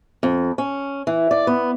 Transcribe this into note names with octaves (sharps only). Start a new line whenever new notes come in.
F2
C#4
E3
D5
B3